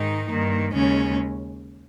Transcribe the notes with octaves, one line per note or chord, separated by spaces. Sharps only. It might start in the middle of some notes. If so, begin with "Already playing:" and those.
Already playing: G#2 D#3 G#3 D#4
G2 D#3 A#3
D#2 C#3 G#3 C#4